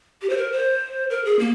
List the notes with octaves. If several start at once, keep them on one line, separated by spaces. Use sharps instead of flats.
G4
C5
A#4
C5
A#4
G#4
A#3